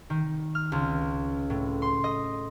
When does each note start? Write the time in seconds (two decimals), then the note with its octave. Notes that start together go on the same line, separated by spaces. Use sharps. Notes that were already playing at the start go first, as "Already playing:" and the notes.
0.10 D#3
0.55 F6
0.72 C#2
1.50 A2
1.82 C6
2.04 D#5